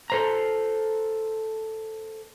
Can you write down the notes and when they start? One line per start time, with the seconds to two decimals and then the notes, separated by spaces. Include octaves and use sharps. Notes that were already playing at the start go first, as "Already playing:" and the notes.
0.10 A4 C5 A#5